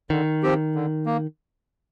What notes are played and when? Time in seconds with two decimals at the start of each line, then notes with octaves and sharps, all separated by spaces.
0.10 D3 D#3
0.43 F3 C4 G4
0.75 D3
1.06 A#3